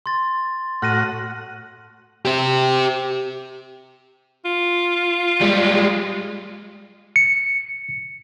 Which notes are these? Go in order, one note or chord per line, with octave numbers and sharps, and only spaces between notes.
C6 A6
A2 F#4 F#5 F6 A#6 D#7
G4 C5
F4
G3 G#3
C#7